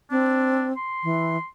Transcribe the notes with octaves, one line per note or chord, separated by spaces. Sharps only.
C4 D4
C6
E3